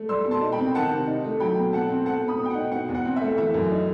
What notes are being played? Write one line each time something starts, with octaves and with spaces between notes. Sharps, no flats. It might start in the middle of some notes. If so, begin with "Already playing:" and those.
Already playing: A3
G3 C6 E6
B2
A5 C6
D#4
G5 B5
C4
D#3 F#5 A5
C3
D#4
A3
F#3 G5 B5
B2
B2 F#5 A5
C4
A3 F#5 A5
B2
B5 D#6
B2
G5
F#5
D#4
B2 F#5
E2
F#5
C4
E5
A3
E3 E5
F#2
D#4